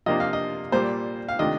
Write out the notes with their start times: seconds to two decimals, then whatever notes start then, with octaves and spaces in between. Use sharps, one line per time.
0.06 C3 F3 A#3 D4 F4 D#5
0.20 F5
0.33 D#5
0.72 A#2 G3 A#3 C5
1.29 F5
1.39 C3 D#3 A3 D4 F4 D#5